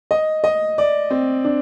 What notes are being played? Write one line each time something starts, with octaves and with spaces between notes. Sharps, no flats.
D#5
D#5
D5
C4
D4